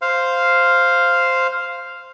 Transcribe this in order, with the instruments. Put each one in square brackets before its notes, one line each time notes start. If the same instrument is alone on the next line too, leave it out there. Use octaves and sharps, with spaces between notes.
[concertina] C5 F5